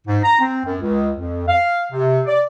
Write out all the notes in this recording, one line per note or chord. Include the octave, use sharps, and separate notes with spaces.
G#2
A#5
C4
F#2
C#2
F2
F5
C3
D5